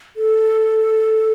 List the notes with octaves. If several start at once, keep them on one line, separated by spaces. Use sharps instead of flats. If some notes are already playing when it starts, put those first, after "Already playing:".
A4